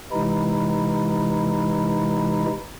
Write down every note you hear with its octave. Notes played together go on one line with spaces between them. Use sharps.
C3 E3 G#3 D#4 E4